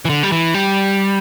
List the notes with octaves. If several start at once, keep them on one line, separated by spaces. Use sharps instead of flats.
E3
D3
G3
E3
G3